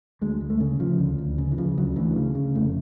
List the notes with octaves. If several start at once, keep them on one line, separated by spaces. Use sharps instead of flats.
D2 G#3
D2
A3
C#3
C#3 F3
D2
D2
C#3
E3
C#3 F3
D2 F#3
D2 E3
C#3
C#3
F1 A3